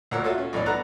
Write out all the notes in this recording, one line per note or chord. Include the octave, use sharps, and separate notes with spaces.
D2 A#2 A#4 C#5 F#5 E6
F4 F#4 A4 C#5 E5
C#4
B1 A2 E3 D5
B3 D4 A4 F#5 A#5 F#6